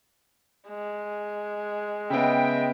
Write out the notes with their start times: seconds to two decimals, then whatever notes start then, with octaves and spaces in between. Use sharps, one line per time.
0.68 G#3
2.10 C#3 B3 D#5 E5 G5